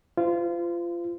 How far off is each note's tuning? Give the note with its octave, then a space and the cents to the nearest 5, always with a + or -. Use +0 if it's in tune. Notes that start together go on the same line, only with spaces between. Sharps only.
F4 -20 C5 -35